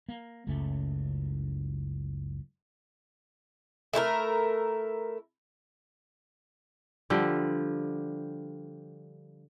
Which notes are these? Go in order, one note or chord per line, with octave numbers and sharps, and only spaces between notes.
A#3
F#1 C#2 A3 C#4
A3 E4 F4 A#4
D3 F3 G3